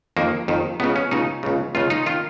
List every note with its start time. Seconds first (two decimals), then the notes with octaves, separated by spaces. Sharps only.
0.17 F2 D#3 A#3
0.48 F2 D#3
0.80 C#2 C#3 B3
0.96 C#4
1.11 C#2 C#3 D#4
1.43 C#2 C#3
1.75 C#2 C#3 F4
1.90 D#4
2.06 D#3 F4